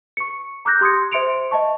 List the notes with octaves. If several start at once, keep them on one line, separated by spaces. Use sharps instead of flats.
C#6 C#7
A#5 D6 E6 F#6 G6 A#6
G4 C6 D#6 G#6 C#7
C5 E5 C6 C#7 D7 F7
D#5 E5 A5 C#6